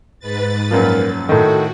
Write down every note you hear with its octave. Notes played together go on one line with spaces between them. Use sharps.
G#2 B4 A6
F#2 A#2 F3 A#4
A2 D#3 F#4 A4